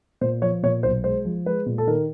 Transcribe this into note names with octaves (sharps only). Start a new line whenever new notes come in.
A#2 C5
F3 C#5
A#2 C#5
B1 C5
G#3 C5
F3
G#3 B4
A#2
A4
D#3 A#4